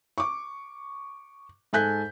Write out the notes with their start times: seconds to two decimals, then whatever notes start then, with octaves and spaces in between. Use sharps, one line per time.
0.18 C#6 D6
1.73 G#2 A4 G#5 F#6 G6 B6